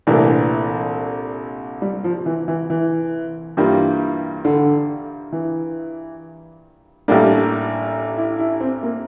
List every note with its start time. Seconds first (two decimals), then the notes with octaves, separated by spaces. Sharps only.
0.07 C2 A#2 E3 A3 D4
1.82 G3
2.04 F3
2.26 E3
2.48 E3
2.70 E3
3.57 G2 E3 G3 A#3 F4
4.45 D3
5.32 E3
7.08 A1 A2 G3 A#3 D4
8.17 E4
8.39 E4
8.60 C4
8.83 A#3